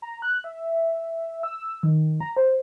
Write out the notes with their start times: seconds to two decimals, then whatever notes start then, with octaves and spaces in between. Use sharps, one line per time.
0.02 A#5
0.22 F#6
0.44 E5
1.43 E6
1.83 D#3
2.21 A#5
2.37 C5